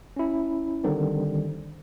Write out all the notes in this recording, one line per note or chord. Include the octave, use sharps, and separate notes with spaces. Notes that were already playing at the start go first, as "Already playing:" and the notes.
C#4 E4
D3 D#3 G3 C4 A#4